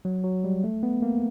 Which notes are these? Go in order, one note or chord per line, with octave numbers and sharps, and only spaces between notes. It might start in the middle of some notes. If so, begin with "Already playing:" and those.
F#3
F#3
G3
A3
B3
A#3